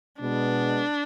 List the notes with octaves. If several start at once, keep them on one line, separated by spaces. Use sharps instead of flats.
B2 G#3 B3 D4